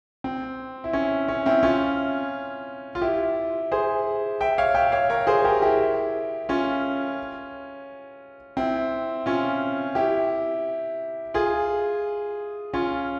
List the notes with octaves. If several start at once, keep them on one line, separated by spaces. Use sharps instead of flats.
C4
E4
C#4
C#4
C4 E4
C#4 F4
F4
E4 G4
G#4 C5
E5 G5
C#5 F5
E5 G5
C#5 F5
A#4 C#5
G#4 C5
G4 A#4
E4 G4
C#4 F4
C4 E4
C#4 F4
E4 G4
F4 G#4
C#4 F4